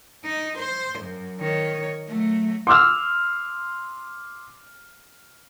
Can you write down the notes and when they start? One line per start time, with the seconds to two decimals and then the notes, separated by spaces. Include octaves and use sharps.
0.24 D#4
0.58 C5
0.99 F#2
1.40 D#3 C#5
2.08 F#3 A3
2.67 C6 D6 E6 F6